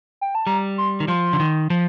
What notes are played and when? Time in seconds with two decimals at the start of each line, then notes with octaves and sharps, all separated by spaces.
0.21 G5
0.35 A5
0.47 G3 A#5
0.78 C6
1.00 D#3
1.08 F3 C6
1.33 D3
1.40 D#3
1.70 F3